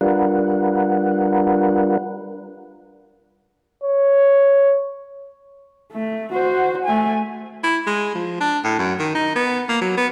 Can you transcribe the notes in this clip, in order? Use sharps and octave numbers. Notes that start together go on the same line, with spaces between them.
G3 D4 F4 A#4 B4 F#5
C#5
A3
F#4 C5
A3 G#5
E4
G#3
F3
D4
A2
F#2
D#3
D#4
B3
A#3
F#3
B3